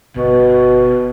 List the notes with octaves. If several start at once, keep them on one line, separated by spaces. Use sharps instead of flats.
G1 B2